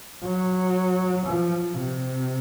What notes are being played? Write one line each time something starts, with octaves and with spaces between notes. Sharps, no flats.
F#3
F3
C3